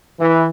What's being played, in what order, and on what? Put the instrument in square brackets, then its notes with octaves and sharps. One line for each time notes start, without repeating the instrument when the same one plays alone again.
[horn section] E3